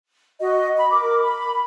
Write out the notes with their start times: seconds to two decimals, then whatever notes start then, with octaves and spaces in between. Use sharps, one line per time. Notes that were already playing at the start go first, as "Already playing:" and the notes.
0.40 F#4 D#5
0.78 B5
0.91 A#4 D6
1.23 B5